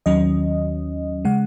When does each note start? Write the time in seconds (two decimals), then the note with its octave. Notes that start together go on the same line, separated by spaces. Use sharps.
0.06 D#2 D#3 F#3 C#4 D#5
1.25 C#3 G#3 F#5